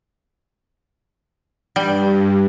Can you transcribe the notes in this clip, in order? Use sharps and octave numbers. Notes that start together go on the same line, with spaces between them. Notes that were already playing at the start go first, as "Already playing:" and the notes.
G2 G3